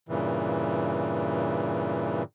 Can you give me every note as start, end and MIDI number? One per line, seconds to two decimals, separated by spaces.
0.09 2.23 43
0.09 2.23 46
0.09 2.23 49
0.09 2.23 52